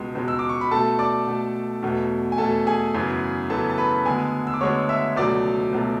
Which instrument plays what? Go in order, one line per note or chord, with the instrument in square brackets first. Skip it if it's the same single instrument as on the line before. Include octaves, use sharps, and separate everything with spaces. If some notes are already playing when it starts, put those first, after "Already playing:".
Already playing: [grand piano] C#2 B2 G#3
C#2 B2 G#3
E6
D6
C#6
B5
B2 A3 A4 A5
D5 D6
B2 A3
E2 B2 A3
G#5
E2 B2 A3 A4 A5
G#4 G#5
F#2 C#3 E3 B3
F#2 C#3 E3 B3 A4 A5
A5
B4 B5
D2 D3 G#3 B3 G#4 G#5
E6
D6
D2 D3 G#3 B3 C#5 C#6
E5 E6
C#2 B2 F#3 A3 D5 D6
C#2 B2 F#3 A3